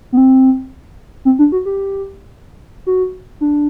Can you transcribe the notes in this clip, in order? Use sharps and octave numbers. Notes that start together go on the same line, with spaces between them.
B3
C4
C4
D4
F#4
G4
F#4
D4